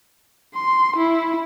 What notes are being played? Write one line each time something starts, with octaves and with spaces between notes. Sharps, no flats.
C6
E4